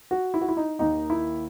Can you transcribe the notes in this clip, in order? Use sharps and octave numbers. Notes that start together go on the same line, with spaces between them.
F#4
E4
F#4
E4
D#4
D#2 D#3 D#4
E4